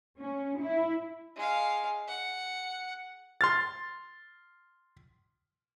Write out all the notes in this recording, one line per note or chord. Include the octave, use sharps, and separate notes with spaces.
C#4
E4
G#3 F5
F#5
C6 F6 A6